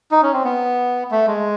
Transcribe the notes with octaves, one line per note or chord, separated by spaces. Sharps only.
D#4
C#4
C4
B3
A3
G#3